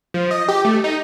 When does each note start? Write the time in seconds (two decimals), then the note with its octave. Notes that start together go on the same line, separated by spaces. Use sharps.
0.14 F3
0.31 D#5
0.48 G4
0.65 A3
0.84 D#4